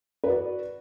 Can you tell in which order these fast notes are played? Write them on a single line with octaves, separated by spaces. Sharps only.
B4 F#4 D5